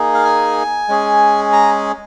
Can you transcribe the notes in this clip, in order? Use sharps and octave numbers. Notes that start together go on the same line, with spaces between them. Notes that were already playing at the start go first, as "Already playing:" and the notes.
Already playing: A#3 D#4 G#4
F5
G#5
G#3 C#4 G#4
A#5